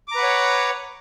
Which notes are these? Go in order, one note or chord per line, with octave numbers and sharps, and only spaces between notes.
B4 C#5 F#5 A#5 D6